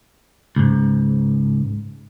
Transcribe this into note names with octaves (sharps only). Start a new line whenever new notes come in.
C#2 G#2